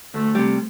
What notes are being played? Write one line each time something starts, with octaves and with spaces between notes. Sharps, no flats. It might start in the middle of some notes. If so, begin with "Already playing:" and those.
D2 A3
C3 G3